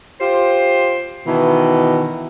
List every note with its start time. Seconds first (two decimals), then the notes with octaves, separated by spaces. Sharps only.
0.21 F4 G4 C5
1.27 B2 D#3 E3